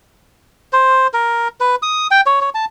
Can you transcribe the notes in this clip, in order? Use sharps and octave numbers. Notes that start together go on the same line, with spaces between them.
C5
A#4
B4
D#6
G5
C#5
C#5
A5